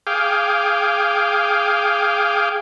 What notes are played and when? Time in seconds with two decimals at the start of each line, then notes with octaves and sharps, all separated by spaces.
0.07 G#4 F5 G5 D6